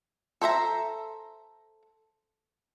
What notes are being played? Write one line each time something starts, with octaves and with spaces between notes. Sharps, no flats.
A4 C5 E5 A#5